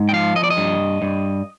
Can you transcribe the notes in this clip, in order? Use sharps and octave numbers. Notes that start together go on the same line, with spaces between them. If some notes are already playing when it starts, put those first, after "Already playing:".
Already playing: G#2
G5
F3 F5
D#5
D5
D#5
G2
G2